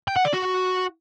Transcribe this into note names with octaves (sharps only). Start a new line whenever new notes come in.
G5
F#5
D5
F#4